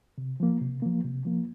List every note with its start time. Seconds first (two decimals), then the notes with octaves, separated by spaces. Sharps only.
0.18 C3
0.40 F3 A#3
0.62 C3
0.82 F3 A#3
1.05 C3
1.25 F3 A#3